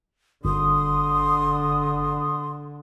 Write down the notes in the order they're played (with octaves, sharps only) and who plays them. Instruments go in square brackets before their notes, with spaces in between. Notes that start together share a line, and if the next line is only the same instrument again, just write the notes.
[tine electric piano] G1 [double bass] D3 [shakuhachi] C6 [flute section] D#6